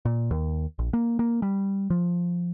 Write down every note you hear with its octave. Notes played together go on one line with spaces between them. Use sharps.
A#2
D#2
A#1
A#3
A#3
G3
F3